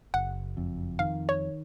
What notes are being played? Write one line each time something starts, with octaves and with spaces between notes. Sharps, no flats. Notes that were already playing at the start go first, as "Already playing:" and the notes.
F#1 F#5
F2
D#3 F5
C#5